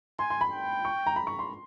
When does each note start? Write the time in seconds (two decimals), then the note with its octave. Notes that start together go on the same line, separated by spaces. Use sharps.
0.19 G#5 C6
0.30 C6
0.41 B5
0.52 G5
0.85 C#6
1.06 A#5
1.16 B5
1.27 C#6
1.39 C6